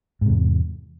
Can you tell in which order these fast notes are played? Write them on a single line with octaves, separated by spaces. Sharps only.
G#2 C3 E2